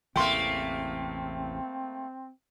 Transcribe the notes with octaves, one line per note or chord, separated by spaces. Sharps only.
A1 E2 C3 A3 A#3 C4 G5 C6